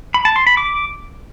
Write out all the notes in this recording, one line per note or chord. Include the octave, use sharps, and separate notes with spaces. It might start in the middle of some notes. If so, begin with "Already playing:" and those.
B5
A5
C6
B5
D6